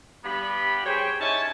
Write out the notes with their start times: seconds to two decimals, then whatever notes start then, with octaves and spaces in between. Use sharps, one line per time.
0.24 G2 G3 B3 G4 B5
0.85 G4 G#4 C5 C#5 G5
1.20 C#4 D#4 E4 C#5 G#5 A5